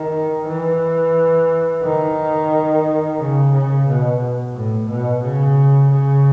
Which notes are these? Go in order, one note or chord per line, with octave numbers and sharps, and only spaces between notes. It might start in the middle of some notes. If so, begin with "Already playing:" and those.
Already playing: D#3
E3
D#3
C#3
C#3
B2
A2
B2
C#3
C#3